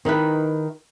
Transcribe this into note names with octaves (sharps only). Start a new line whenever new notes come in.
D#3 D#4 E4 B4